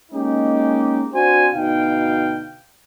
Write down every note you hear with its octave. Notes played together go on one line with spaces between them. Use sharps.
G#3 A#3 C#4 D#4 G4
C4 D4 F#4 C5 G#5
D2 B2 D#4 F5 G5